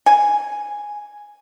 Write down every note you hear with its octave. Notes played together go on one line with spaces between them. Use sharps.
G#5